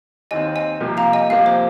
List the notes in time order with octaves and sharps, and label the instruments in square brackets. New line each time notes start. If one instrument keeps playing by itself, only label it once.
[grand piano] D#2 D#3 C4 [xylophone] D#5 G#5
[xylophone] D#5 G#5
[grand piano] C2 C3 F3 A#3
[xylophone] F5 A#5
D#5 G#5
[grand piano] C2 C3 F3 A#3 [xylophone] F5
[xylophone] C5